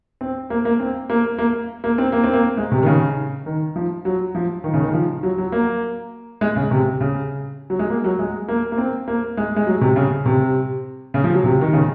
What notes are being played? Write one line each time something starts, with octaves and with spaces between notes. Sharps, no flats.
C4
A#3
A#3
C4
A#3
A#3
A#3
C4
A#3
C4
A#3
G#3
C3
D#3
C#3
D#3
F3
F#3
F3
D#3
C#3
D#3
F3
F#3
F#3
A#3
G#3
C#3
C3
C#3
F#3
G#3
A#3
F#3
G#3
A#3
A#3
C4
A#3
G#3
G#3
F#3
C3
C#3
C3
C#3
F3
F#3
C3
D#3
C#3